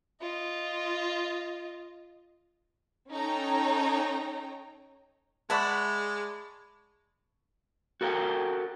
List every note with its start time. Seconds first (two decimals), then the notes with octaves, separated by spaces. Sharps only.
0.21 F4 D#5
3.10 C#4 D#4 A4 C#5 G5 A#5
5.50 G#3 D5 E5 F#5 A5 B5 C#6
8.01 F#4 A4 A#4 F#5 G5